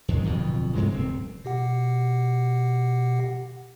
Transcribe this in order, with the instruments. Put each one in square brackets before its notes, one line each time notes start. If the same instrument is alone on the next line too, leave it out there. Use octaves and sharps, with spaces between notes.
[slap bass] D#2 G#2 D#3 G#3
D1 F2 B2
G2 C#3 G#3
D1 C4
[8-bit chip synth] B2 G4 F#5